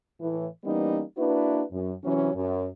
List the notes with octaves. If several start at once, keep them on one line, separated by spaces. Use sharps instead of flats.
A2 E3
E3 G3 A#3 B3 C#4 D#4
A#3 D4 E4 F#4 B4
F#2
C3 E3 F#3 C#4
F#2